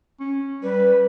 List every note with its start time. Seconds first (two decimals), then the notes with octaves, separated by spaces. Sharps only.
0.20 C#4
0.63 G3 B4